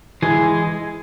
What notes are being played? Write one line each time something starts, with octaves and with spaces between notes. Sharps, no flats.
E3 G#3 G#4